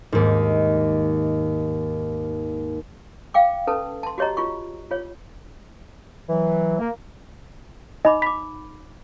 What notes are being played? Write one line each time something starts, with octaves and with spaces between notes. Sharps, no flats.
D#2 G#2
F5 G5 D6
C#4 A4 B4 A5
A5 C6
F#4 G4 C#5 D#5 A#5
F4 C#6
F4 C#5
E3 F#3
A#3
D#4 D#5 B5 D6
B5 D6 B6